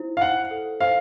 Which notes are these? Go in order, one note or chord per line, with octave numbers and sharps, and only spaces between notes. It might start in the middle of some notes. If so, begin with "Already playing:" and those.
Already playing: E4 C5
F5
E4 F#5
A4
C5 F5